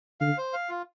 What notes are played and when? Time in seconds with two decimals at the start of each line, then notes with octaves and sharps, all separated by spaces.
0.21 D3 F5
0.38 C5
0.53 F5
0.69 F4